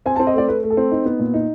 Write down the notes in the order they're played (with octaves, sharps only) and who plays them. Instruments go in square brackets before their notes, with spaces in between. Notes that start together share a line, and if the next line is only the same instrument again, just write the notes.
[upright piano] C4 G#5
A5
C4
D#5
A3 D5
A3 B4
A3
A4
C4
D#4
B3
A#2
D#4